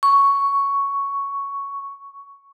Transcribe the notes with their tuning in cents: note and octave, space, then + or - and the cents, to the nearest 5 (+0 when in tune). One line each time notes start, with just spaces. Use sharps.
C#6 +5